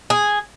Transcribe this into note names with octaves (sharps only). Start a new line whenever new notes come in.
G#4